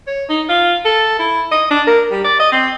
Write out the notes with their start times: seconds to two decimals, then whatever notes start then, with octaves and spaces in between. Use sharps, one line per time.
0.07 C#5
0.29 D#4
0.49 F4
0.85 A4
1.19 E4
1.52 D#5
1.71 D4
1.87 A#4
2.11 G3
2.25 D5
2.40 D#5
2.52 C4